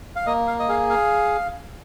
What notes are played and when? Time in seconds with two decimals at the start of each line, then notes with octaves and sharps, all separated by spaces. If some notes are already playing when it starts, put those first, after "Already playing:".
0.16 F5
0.26 A#3 D#5
0.47 F5
0.59 D#5
0.69 G#4 F5
0.90 F5